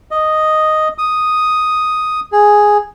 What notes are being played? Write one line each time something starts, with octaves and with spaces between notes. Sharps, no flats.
D#5
D#6
G#4